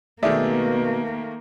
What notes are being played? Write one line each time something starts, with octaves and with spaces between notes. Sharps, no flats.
B2 D#3 A3 A#3 G#4 D5 E5